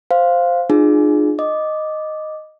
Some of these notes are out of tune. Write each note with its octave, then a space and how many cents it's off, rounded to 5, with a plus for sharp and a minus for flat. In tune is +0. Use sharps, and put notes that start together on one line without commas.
C5 +0 F5 +0
D4 +45 F4 +0 G#4 +10
D#5 -5 D6 +0